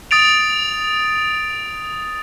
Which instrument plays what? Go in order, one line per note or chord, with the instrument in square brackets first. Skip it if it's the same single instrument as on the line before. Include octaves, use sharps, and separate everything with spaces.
[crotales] D#6 A6 D7 F7